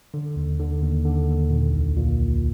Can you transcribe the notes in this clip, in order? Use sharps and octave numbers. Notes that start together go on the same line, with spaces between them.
D3
D#2
D3
D#2
D3
D#2
A#2
C2
A#2